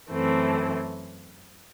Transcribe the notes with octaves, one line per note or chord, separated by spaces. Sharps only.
F#2 E3 A3 C4